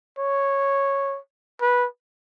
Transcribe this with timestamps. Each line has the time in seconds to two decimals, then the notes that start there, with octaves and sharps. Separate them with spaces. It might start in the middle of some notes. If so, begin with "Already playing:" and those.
0.18 C#5
1.61 B4